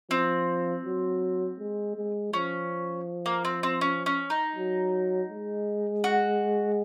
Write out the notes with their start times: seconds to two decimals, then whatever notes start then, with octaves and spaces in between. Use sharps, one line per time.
0.11 F3 C4
0.85 F#3
1.59 G#3
1.96 G#3
2.33 F3 C#4
3.26 A#3
3.45 C4
3.63 C4
3.81 C#4
4.06 C#4
4.30 D#4
4.56 F#3
5.29 G#3
6.04 F#4